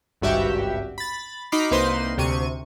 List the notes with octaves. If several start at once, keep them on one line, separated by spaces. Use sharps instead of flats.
G#1 C#2 G2 F#4 G4 E5
B5 A6
D#4 F#4 B5 D6 F6 C7
C2 A#3 D#4 B4 C5 C6
D2 C3 C#6 D#7